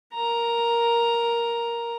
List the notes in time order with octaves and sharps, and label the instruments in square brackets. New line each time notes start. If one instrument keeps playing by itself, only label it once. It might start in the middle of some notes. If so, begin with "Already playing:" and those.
[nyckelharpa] A#4 A#5